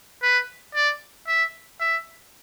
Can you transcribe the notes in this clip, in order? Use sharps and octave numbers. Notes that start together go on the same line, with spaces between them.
B4
D5
E5
E5